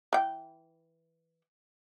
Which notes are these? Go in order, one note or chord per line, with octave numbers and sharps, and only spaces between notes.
E3 G5